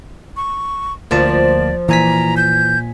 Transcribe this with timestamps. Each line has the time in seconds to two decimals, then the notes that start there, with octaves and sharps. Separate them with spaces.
0.37 C#6
1.11 D2 F3 A#3 D5 A5
1.89 A#2 E3 G#5 A#5 B6
2.37 G6